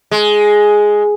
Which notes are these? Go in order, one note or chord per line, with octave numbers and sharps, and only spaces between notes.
G#3